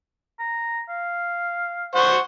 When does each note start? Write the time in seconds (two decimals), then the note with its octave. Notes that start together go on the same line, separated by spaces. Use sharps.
0.39 A#5
0.89 F5
1.95 C5 F#5 C#6